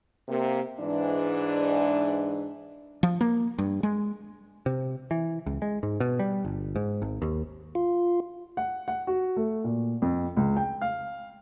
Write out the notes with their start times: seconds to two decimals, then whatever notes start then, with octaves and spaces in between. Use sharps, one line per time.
0.28 C3 A#3
0.80 G#2 E3 D4
3.03 F3
3.21 A#3
3.58 G2
3.83 G#3
4.66 C3
5.11 E3
5.46 C#2
5.62 G#3
5.83 G#2
6.00 B2
6.19 G3
6.45 G1
6.76 G#2
7.02 G#1
7.22 D#2
7.75 F4
8.57 F#5
8.88 F#5
9.07 F#4
9.37 A3
9.64 A#2
10.02 F2
10.37 C#2
10.57 G5
10.82 F5